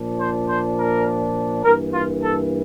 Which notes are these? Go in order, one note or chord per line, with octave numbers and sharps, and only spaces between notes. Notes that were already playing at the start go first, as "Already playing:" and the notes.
Already playing: A#2 F3 A#3 D4
C5
C5
A#4
G2 E3 A#3 A#4
F4
A4